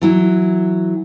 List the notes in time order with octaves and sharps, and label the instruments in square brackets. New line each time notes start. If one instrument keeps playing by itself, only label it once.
[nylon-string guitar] E3 F#3 E4